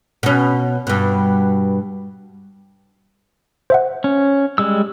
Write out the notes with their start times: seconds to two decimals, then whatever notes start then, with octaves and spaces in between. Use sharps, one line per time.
0.23 B2 C#4
0.87 G2 B2
3.70 C5 E5 F#5
4.04 C#4
4.58 G3 G#3 E6